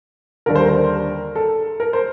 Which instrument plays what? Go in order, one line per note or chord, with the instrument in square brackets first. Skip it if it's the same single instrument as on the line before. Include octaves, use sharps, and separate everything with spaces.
[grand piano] D#2 D3 G3 A#4
C5
A#4
A4
A#4
C5